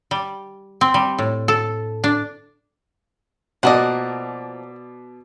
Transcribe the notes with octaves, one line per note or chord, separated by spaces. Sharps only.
G3
C4
G3
A2
A4
D4
B2 F3 A#3 D5 D#5 F#5